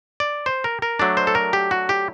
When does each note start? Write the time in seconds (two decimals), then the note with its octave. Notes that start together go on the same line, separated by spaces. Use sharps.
0.20 D5
0.46 C5
0.64 A#4
0.82 A#4
0.99 F#3 A3 D4 D5
1.17 C5
1.27 A4
1.35 A#4
1.53 G4
1.71 F#4
1.89 G4